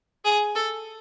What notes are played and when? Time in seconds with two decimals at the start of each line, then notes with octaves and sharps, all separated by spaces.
0.25 G#4
0.55 A4